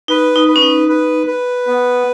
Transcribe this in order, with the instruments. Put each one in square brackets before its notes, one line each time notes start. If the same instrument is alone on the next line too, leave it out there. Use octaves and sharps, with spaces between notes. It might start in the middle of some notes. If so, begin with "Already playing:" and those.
[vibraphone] D#4 [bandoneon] B4
[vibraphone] D#4
[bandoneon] B4
[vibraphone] C#4
D#4
[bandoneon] B4
B4
B3